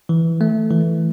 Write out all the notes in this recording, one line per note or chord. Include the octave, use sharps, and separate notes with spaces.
E3
A3
E3